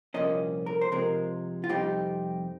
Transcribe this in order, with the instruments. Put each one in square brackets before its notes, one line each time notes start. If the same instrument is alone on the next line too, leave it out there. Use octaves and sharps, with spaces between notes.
[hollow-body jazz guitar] C2 A#2 F3 A#3 C#4 D#5
A#4
C5
C3 F3 G#3 A#4
F4
F2 C3 G3 C4 D#4 G4